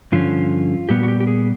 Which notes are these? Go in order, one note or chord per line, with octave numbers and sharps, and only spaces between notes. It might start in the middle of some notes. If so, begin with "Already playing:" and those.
G2 D3 F3 C#4 F4
A#2 G3 B3 G4
F#4
G4
G4
G#4